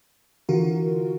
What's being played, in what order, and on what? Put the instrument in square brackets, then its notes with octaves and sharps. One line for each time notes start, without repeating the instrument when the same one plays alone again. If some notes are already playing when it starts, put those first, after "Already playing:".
[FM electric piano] D3 E3 F4 F#4 A#4